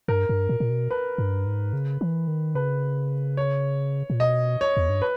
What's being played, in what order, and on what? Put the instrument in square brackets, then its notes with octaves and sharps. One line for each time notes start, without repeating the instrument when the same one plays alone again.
[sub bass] G2 [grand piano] A#4
[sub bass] G2
A#2
A#2
B2
[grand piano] B4
[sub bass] G2
G#2
C#3
E3
D#3
[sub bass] C#3 [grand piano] B4
[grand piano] C#5
[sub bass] A#2
[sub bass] B2 [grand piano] D#5
[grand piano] C#5
[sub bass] E2
G2
[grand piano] B4